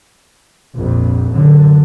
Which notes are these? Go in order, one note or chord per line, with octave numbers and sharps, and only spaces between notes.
A#1 F2
F#2 D3